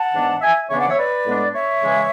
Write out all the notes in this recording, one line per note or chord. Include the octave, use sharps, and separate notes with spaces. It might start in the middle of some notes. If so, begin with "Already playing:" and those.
Already playing: F#5 A5
G#2 E3 B3 D4
E5 G#5
C#3 E3 B3 D4 C#5 E5
D5 F#5
C#5 E5
B4 D5
A2 G#3 B3 D4
C#5 E5
C#3 E3 G#3